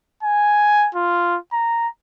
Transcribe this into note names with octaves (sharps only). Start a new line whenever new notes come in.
G#5
F4
A#5